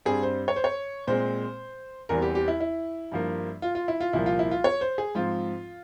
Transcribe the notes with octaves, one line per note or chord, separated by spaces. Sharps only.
G2 G3 C4 G#4
C5
C#5
C5
C#5
A#2 G#3 C4 C5
E2 E3 G3 C4 A#4
G4
G4
E4
E4
G2 F3 A#3
F4
F4
E4
F4
C2 A#2 F3 A#3 E4
F4
E4
F4
C#5
C5
G#4
G#2 F3 C4 F4